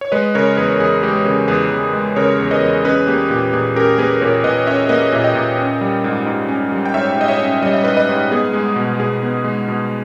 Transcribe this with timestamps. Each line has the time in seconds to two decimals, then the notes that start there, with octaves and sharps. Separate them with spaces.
0.01 C#5
0.12 G#3 B4 D#5
0.35 C#3 A#4 C#5
0.57 E2 G#4 B4
0.80 E2 G#4
1.03 G#3 G4
1.25 C#3 G#4
1.48 E2 G#4 B4
1.71 E2
1.93 G#3
2.16 C#3 A#4 C#5
2.40 E2
2.51 B4 D#5
2.62 E2
2.85 C#4 G#4 B4
3.07 A#3 G4
3.30 A#2 G4
3.53 A#2 G#4
3.76 C#4 G4 A#4
3.98 A#3 G#4 B4
4.21 A#2 A#4 C#5
4.44 A#2 B4 D#5
4.67 C#4 C#5 E5
4.89 A#3 B4 D#5
5.12 A#2 E5
5.24 D#5 G5
5.35 A#2
5.58 C#4
5.81 G3
6.04 G#2
6.26 G#2
6.48 C#4
6.72 G3
6.86 G5
6.94 G#2 C#5 E5
7.17 G#2 D#5
7.28 C#5 E5
7.40 C#4
7.62 G3 D#5
7.73 E5
7.84 G#2 B4 D#5
7.97 B4 D#5
8.09 G#2
8.31 B3 G#4
8.53 G#3
8.76 B2
9.00 B2 G#4
9.23 B3
9.44 G#3
9.68 B2